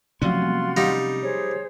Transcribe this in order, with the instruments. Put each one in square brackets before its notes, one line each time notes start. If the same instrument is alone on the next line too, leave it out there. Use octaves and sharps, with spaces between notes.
[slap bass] C3 C#4 [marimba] F3 F#3 A3 [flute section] F4 F#4 C6
[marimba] G3 A#3
[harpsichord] G3 D#4 [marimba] F5 F#5 D#6
[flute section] G#4 C5 C#5